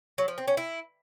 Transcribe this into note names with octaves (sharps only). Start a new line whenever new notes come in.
F#3
F3
C4
C#4
E4